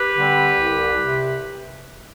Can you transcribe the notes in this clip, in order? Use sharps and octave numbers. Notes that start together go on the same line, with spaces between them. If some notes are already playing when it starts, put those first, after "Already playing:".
Already playing: G4 B4
D3 G3 C4
C2
C3